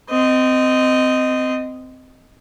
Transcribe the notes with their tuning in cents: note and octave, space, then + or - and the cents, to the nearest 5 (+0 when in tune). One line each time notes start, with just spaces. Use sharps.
C4 -20 D#5 -5